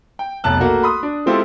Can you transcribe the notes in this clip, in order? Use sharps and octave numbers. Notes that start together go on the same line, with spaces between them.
G5
F1 B1 A5 F#6
A3 A#3 F#4
B5 C6 D#6
D4
G#3 C4 E4 F4 G4 A4